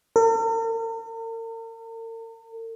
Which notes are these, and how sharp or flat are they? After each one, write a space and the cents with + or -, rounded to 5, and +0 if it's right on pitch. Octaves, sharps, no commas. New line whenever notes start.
A#4 -45